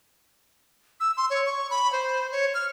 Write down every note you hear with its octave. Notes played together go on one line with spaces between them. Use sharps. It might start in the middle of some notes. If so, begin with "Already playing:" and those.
E6
C6
C#5
C#6
B5
C5
C#5
F6